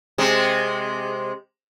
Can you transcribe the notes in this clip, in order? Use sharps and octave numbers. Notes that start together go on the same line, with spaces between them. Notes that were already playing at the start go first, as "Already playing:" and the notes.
C3 G#3